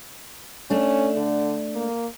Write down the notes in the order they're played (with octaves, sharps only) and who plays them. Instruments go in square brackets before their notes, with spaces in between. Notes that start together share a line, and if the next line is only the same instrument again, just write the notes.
[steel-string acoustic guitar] A3 D4 [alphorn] C#4
[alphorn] D3
A#3